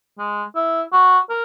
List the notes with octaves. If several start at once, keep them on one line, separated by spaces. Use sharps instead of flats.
G#3
E4
F#4
A#4